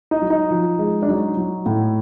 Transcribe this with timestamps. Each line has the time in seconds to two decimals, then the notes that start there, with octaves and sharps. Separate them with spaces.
0.11 D#4
0.22 F#3
0.30 D#4
0.50 F3
0.79 G#3
1.02 D4
1.09 F#3 D#4
1.37 F#3
1.66 A2